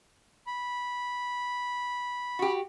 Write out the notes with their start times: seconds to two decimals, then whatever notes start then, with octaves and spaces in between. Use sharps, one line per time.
0.47 B5
2.39 F#4 G4